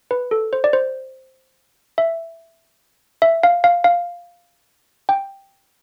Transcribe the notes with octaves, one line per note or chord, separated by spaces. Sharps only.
B4
A4
C5
D5
C5
E5
E5
F5
F5
F5
G5